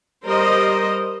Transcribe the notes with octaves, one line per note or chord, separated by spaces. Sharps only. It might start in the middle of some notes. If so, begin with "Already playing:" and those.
G3 A#4 C5 D#5